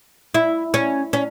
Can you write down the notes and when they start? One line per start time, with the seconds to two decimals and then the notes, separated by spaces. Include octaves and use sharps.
0.34 E4
0.74 C#4
1.13 C#4